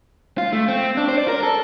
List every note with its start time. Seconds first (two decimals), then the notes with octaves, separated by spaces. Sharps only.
0.38 F4
0.52 A3
0.68 C4
0.97 D4
1.08 C5
1.18 D5
1.28 A#4
1.43 A4